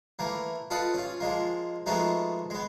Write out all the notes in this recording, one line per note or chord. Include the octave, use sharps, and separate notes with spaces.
E3 A3 A#3
F4 A4 B4 D#5 F#5
C#4 F4
F3 G#3 A#3
F3 G#3 A3 B3 D#4 F#4
G#3 B3